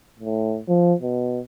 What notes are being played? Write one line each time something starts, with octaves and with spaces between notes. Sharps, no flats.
A2
F3
B2